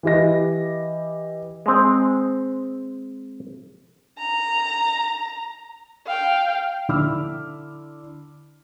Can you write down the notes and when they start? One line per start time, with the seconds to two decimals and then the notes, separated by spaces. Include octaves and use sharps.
0.03 E3 E4 G4 D#5 A#6
1.66 G#3 C4
4.18 A#5
6.07 F5 G5
6.89 D3 E4 B5 D6 E6 F6